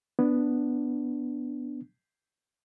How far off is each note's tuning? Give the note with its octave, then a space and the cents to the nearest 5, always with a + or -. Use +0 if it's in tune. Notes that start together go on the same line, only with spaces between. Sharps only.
B3 +0 D4 +0